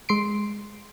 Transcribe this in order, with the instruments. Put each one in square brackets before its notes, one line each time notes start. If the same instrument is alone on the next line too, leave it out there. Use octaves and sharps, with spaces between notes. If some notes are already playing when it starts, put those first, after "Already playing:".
[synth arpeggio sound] G#3 C6 C7 D7